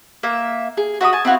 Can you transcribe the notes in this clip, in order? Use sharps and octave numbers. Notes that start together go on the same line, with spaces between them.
A#3 E5
G#4
F#4 E5 B5 D#6
G#5 A5
C4 E4 F#4 F5